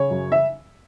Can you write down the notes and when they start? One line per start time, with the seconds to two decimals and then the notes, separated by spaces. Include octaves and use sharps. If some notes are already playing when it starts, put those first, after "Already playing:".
Already playing: C#3 C#5
0.10 F#2
0.32 E5